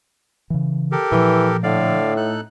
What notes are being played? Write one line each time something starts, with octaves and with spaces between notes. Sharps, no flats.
C#3 E3
G4 A4 A#4
A#2 E3 F3
A2 D3 D5 F5
D#4 A4 F#6